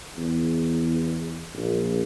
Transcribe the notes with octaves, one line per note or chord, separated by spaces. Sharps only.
E2
A#1